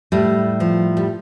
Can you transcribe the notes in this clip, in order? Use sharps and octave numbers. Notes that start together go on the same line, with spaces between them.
A2 G3
F3
G3